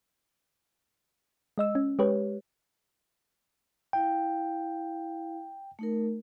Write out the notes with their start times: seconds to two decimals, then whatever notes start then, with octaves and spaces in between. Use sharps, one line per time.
1.58 G#3 D#5 E6
1.75 C#4
1.99 G#3 G4 B4 C#5
3.93 E4 F5 G5
5.79 A3 D#4 A#4